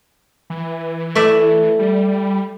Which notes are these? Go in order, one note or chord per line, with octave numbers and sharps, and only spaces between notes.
E3
A3 D5 E5
G3